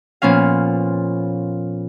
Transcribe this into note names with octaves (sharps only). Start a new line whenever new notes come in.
A#2 F3 B3 C#4 F5